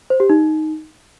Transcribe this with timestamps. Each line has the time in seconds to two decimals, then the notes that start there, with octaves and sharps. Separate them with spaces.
0.10 C5
0.20 G4
0.30 D#4